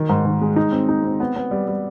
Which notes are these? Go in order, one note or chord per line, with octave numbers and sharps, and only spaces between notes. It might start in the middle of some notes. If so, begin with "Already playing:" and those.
Already playing: D#3
G#2
D#3
G#3
D#4
C4
D#4
C4
B3
B3
G3
G3